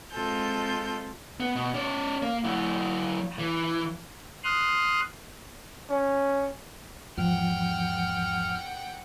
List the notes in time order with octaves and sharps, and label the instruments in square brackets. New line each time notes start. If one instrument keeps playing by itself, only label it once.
[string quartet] C3 G#3 C4 F4 A4 G6
[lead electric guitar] B3
B2
C#4 D5
A#3
F#3 E4
E3
[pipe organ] C6 D#6 F6 F#6
[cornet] C#4
[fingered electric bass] E2 G#2 E3 [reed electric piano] F3 [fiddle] F#5 G5 [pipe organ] F6